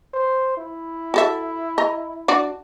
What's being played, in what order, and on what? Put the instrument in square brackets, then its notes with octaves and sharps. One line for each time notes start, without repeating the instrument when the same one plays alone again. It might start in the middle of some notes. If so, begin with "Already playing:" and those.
[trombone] C5
E4
[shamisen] F#4 A4 E5
D#5 A#5
D4 F#4 D5